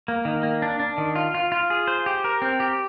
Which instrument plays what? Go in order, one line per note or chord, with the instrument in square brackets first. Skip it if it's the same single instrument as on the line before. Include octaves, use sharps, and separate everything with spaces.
[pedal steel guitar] A#3
D#3
A#3
D4
D4
D#3
F4
F4
F4
G#4
C5
G4
A#4
C4
G4